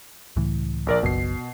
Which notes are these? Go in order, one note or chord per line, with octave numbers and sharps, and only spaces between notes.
C#2 A2 E3
A#1 A#4 D5
F#1 B1 B2 C7